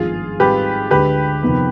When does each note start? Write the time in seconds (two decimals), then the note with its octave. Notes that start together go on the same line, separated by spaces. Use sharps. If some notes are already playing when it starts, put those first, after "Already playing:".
Already playing: G#1 G2 F3 B3 D#4 F4 G#4
0.39 G#2 D#3 G3 C4 G4 B4
0.91 D2 D3 G#3 G4 B4
1.43 F2 C3 D#3 B3 D#4